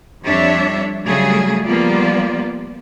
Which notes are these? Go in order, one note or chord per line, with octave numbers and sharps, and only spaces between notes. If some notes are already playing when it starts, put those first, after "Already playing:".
F2 G3 D4 C#5 E5
C#3 F#3 G3 A3 G#4
F3 G3 A#3 B3 F4 D5